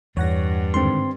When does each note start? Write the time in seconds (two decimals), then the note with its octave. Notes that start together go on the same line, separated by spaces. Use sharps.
0.17 E2 G2 C#5 F#5 A#6
0.74 G#2 D3 D#3 C4 C6